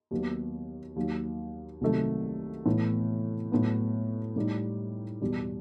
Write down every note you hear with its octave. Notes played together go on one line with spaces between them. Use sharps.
D#2 D#3 F#3 B3
D#2 D#3 F#3
C2 C3 D#3 F#3 A3
A2 E3 B3
A2 F#3 B3
A2 G3 D#4 G4
E2 B2 G3